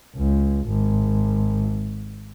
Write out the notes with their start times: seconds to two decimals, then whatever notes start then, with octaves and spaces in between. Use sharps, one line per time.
0.16 C#2
0.67 G#1